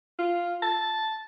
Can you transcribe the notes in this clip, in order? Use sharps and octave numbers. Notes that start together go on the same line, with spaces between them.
F4
A5